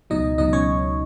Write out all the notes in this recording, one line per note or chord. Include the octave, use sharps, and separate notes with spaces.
C#2 B2 F#3 D#4 D#5
C#2 B2 F#3 D#4 D#5
C#4 C#5